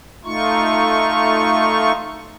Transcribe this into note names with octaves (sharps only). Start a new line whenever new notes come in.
A3 D#4 F4 C#6